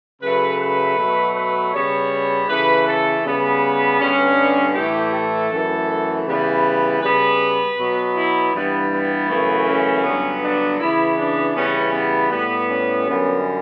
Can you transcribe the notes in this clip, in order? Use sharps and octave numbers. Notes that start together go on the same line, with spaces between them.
C#3 F#3 A3 B4
B4
B2 F#3 A3
B4
C#3 G3 B3 C#5
C#3 E3 A3 B4
A4
C#3 G3 B3
G2 D3 G3 B3 C#4
A2 E3 A3 G4
A4
F#2 E3 A3
C#3 E3 G3 B3 B4
C#3 G3 B3 B4
B2 F#3 B3
E4
G2 E3 G3 B3
B3
F#2 C#3 E3 A3
C#4
G2 D3 F#3 B3
D4
C#3 E3 B3 E4
D4
C#3 E3 G3 B3 C#4
B3
A2 G3 B3
C#4
F#2 D3 G3 B3